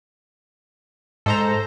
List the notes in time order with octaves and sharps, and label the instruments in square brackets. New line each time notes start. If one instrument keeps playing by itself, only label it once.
[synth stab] G#2 [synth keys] A4 C5 A#5